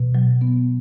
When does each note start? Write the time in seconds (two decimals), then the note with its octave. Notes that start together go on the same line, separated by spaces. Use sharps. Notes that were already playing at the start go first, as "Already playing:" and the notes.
Already playing: B2
0.15 F#3
0.41 B3